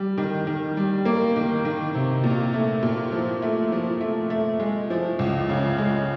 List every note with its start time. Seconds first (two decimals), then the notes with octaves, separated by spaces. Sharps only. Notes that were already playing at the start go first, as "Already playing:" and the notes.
Already playing: G3
0.18 D#3
0.47 D#3
0.77 G3
1.05 A#3
1.36 D#3
1.65 D#3
1.95 C3
2.23 A#2
2.54 A3
2.82 A#2
3.12 F3
3.42 A3
3.72 F3
4.01 A3
4.30 A3
4.60 G#3
4.90 F3
5.19 C#2
5.49 C#3
5.78 G#3